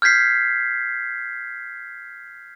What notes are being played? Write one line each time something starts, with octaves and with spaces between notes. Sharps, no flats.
F6 G6 G#6 B6 C7